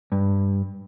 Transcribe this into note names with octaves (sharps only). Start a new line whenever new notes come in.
G2